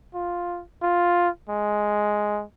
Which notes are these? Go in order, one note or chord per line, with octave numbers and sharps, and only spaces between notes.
F4
F4
G#3